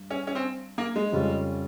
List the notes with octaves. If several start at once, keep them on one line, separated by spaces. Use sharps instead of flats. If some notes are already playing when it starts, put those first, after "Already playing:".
Already playing: G2
C#4
C#4
C4
A#3
G#3
F2 C#3 G3 C#4 F4